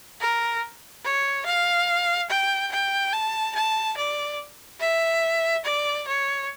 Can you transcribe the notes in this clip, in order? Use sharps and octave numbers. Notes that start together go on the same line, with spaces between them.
A#4
C#5
F5
G5
G5
A5
A5
D5
E5
D5
C#5